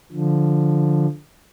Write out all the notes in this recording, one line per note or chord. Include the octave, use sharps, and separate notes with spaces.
D3 F3